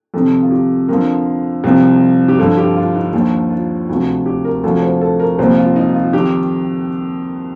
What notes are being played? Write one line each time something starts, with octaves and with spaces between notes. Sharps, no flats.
F2 C3 D#3 A4
F4
G4
F2 D3 F3 A#4
C2 C3 F3
G4
G2 D3 F3 A4
G4
F4
D#4
D#2 D3 F3 D#4
F4
D2 C3 F3 D#4
G4
A#4
D2 C3 F3 A4
C5
A4
A#4
C2 A#2 F3 C5
F4
D#4
F4
F2 D#3 G4